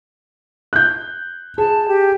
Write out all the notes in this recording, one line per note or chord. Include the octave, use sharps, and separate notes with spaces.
F#6 G6
G#4 A5
G4